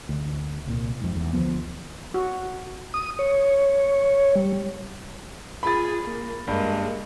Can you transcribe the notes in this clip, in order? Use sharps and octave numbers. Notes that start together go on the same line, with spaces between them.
D2
C2 A#2
F2 G#2
E2
D2 F3 B3
F#4
D#6
C#5
G3
F4 G#4 B5 A6
A#3
G2 G#3 A#3